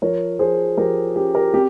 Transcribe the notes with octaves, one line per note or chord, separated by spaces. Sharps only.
F3 A#4 C#5
F3 G#4 C5
F3 G4 A#4
C#4 G4
G4 A#4
C4 G4